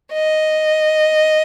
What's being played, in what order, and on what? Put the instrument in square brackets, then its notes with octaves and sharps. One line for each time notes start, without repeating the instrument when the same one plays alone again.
[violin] D#5